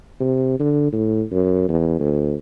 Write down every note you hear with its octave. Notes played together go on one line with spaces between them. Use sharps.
C3
D3
A2
F#2
E2
D2